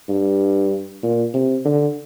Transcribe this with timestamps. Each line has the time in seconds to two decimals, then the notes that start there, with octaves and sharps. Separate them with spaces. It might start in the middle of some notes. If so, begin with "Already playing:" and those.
0.09 G2
1.03 A#2
1.34 C3
1.65 D3